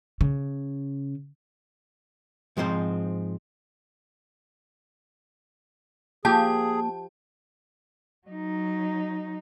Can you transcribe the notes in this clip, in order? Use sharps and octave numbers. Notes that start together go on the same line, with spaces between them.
C#3
G#2 F3 G#3 C4 C5
F3 A#3 G4 G#4 A5
F#3 D#4